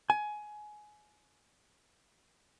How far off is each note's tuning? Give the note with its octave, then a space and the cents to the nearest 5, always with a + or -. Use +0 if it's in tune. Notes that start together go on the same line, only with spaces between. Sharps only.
G#5 +20